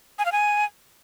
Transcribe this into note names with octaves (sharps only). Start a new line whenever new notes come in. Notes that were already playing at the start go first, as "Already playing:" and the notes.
G#5
F5
G#5